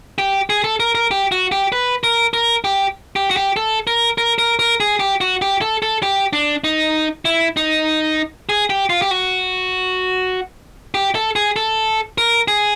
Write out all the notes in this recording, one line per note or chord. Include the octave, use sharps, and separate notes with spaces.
G4
G#4
A4
A#4
A#4
G4
F#4
G4
B4
A#4
A#4
G4
G4
F#4
G4
A4
A#4
A#4
A#4
A#4
G#4
G4
F#4
G4
A4
A4
G4
D4
D#4
E4
D#4
G#4
G4
F4
G4
F#4
G4
A4
G#4
A4
A#4
G#4